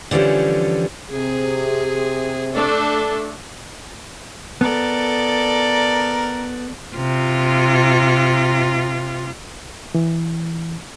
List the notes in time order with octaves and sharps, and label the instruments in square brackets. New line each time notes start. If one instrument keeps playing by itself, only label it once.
[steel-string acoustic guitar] D3 E3 F3 G3 C#4
[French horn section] C3 [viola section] G#4
[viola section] A3 D4 A4
[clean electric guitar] B3 [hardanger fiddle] A4 D5 [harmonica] A#4
[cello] C3 F4
[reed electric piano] E3